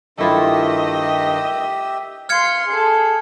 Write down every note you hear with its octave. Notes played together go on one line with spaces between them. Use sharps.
G2 D#3 A3 E4 F4 G4 D#5 E5
F5 C6 F6 G#6 C#7
G#4 A4